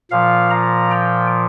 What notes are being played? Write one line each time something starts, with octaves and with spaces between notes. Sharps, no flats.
A#2 F3 F5
A#5
G5